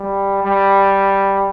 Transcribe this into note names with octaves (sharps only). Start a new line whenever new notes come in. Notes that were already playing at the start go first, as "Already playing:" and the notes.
Already playing: G3
G3